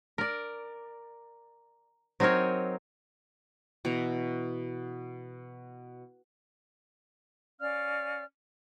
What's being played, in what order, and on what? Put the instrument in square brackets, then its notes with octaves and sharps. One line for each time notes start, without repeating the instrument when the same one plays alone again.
[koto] A#4 D5
F#3 C4 D#4 A#4 C#5
[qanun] B2 E3 E5 A#5
[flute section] C#4 D5 F5 F6